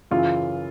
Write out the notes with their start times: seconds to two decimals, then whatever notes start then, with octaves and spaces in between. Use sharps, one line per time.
0.11 F#2 C#3 E3 F4